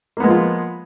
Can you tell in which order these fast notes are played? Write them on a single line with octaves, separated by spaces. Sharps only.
A#3 B3 G#3 F3 F4